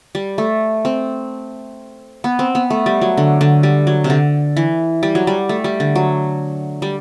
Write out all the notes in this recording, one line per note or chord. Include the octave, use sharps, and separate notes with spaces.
G3
A3
C4
B3
C4
B3
A3
G3
F#3
D3
D3
G3
F#3
C3
D3
E3
G3
F#3
G3
A3
G3
D3
F#3
G3